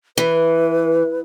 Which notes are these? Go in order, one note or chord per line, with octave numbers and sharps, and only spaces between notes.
E3 B4